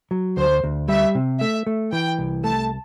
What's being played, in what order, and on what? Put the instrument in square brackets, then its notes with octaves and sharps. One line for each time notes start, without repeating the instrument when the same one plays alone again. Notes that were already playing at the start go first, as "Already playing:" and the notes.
[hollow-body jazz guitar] F#3
[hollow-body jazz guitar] D2 [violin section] C5
[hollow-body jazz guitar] D2
[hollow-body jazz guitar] G3 [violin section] E5
[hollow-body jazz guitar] C3
[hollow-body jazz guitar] A3 [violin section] E5
[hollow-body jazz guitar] A3
[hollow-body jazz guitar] E3 [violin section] G5
[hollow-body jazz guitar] C2
[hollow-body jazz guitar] A3 [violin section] A5